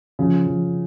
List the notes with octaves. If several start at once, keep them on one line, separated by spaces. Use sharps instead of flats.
C#3 F3
F3